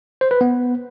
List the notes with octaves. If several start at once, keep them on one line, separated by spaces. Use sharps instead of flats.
C5
B4
B3